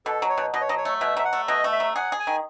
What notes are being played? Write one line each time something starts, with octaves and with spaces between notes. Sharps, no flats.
B2 A4
F#3
C#5
B2
B2 D#5
C#5
F#3 D#5
C#5
A3
B2 E5
F#3 E5
F#5
A3
B2 D#5
A3
E5
F#3
G#4 F#5
G#4
G#5
D#3